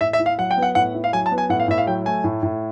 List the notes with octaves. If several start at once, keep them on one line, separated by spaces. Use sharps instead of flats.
A2 E5
E5
E4
F5
F#3 F#5
G5
B3
F#5
A2 F#5
E4
F5
F#3 G#5
A5
B3
G#5
A2 F#5
F5
A2 E5
F5
F#3 G5
A3 G#5
A2
A2